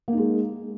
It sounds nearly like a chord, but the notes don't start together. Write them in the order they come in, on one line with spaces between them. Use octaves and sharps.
A#3 D#4 G#3